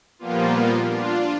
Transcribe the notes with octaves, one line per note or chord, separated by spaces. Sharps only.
A#2 F3 G3 A#3 B3 F4
D4 F4